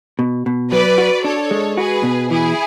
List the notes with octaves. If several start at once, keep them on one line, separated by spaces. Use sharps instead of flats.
B2
B2
F#3 B4 D5
F#4
D4 A4 C#5
G#3
F#4 G#4 B4
B2
E3 E4 G#4